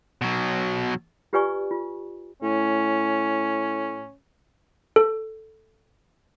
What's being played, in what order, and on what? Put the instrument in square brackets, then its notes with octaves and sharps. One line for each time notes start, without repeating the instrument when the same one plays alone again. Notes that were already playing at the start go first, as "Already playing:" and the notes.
[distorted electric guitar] B2 F#3
[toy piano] F4 G4 B4 D5 G#5 C#6
F4
[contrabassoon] A2 [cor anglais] C#4
[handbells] A4